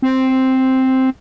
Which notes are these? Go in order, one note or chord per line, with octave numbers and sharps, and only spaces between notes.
C4